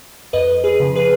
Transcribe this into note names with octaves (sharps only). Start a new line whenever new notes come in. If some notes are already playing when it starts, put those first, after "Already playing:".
F2 B4 D#5
G#4 B4
C#3 F3
G#4 B4